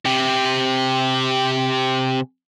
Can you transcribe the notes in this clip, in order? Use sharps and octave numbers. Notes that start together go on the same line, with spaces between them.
C3 G4